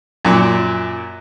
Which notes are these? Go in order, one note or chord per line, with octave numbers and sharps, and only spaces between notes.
F#2 A#2